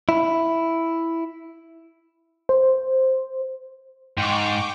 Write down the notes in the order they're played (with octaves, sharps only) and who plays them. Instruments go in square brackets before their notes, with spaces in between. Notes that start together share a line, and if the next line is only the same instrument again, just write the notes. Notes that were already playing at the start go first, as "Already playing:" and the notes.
[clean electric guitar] E4
[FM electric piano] C5
[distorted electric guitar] G#2 [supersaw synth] G5 C#6 D6